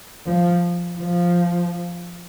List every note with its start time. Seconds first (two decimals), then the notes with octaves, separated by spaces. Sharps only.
0.26 F3
0.99 F3